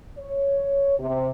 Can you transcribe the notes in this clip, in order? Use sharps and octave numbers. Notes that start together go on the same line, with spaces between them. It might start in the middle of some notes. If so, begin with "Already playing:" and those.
C#5
C3